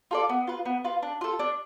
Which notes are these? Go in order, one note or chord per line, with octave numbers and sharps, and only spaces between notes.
F4 A4 D5
B3
F4 B4
B3
F4 B4
D4
F4 A4
D4